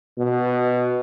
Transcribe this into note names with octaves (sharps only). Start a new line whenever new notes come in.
B2